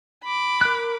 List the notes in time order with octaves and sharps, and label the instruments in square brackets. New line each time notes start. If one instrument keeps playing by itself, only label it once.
[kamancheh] B5 D6
[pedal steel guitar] A#4 F6 F#6